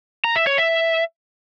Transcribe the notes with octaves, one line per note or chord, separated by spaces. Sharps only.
A#5
E5
C#5
E5